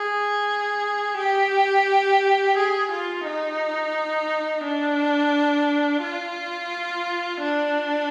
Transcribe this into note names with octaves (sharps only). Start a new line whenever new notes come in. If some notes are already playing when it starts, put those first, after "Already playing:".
Already playing: G#4
G4
G#4
F4
D#4
D4
F4
D4